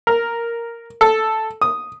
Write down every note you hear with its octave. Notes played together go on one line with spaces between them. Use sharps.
A#4
A4
D#6